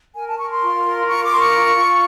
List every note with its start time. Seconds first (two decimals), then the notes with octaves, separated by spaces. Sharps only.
0.15 A#4 G#5
0.27 A5
0.38 A#4 C#6
0.50 C6
0.62 F4
0.85 A#4
1.08 F4 C#6
1.23 D6
1.32 A#4 C6
1.39 C#6
1.55 F4
1.78 F4